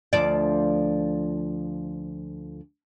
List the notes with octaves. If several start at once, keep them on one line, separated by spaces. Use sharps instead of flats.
D2 F3 D5